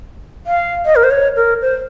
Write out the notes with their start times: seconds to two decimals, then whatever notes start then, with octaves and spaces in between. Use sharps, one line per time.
0.47 F5
0.86 D#5
0.96 A#4
1.04 C5
1.11 C#5
1.36 A#4
1.62 C5